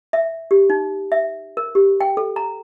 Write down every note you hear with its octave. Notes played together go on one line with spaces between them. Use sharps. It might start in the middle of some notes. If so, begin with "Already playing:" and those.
E5
G4
D#4
E5
A#4
G4
G5
A4
A#5